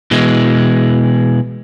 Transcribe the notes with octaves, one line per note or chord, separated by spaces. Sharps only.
B2 E3 G#3